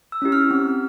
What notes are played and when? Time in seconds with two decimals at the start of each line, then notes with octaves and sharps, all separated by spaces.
0.12 E6
0.22 C#4 E4 G4
0.32 F6
0.51 C4